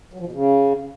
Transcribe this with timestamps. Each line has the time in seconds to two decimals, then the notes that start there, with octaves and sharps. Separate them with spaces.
0.14 F#3
0.20 F3
0.26 B2
0.32 C#3